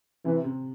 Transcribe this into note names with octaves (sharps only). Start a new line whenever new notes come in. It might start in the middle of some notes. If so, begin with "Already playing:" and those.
C3 E3
C3